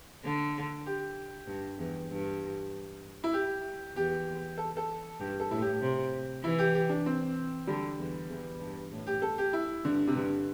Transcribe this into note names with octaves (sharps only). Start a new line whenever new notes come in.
D3
G4
G2
E2
G2
E4
G4
E2 G4
A4
A4
G2 G4
A4
A2 E4
G4
C3
E3 E4
G4
G4
D4
C4
D3 G3
E2
E2
G2
A2
G4
A4
G4
E4
G2 D3
C3
G2 D3